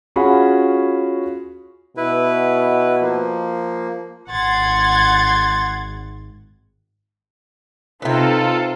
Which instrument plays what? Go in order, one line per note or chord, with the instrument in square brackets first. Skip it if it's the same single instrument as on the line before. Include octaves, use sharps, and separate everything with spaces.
[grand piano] C#4 F4 F#4 G#4 B5
[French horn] B2 [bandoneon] E4 B4
[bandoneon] F3 A#3
[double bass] G#1 [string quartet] F#5 G#6 A6 [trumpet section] C6
[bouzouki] C3 B4 [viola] C4 D#4 [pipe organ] F4 A4